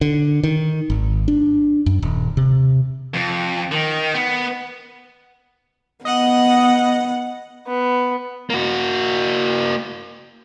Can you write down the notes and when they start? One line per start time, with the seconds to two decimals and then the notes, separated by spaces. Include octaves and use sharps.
0.01 D3
0.43 D#3
0.90 G#1
1.28 D4
1.86 F#2
2.02 D#1
2.37 C3
3.14 F2
3.72 D#3
4.14 B3
6.05 B3 D#5 F#5
7.67 B3
8.50 A#3 F#4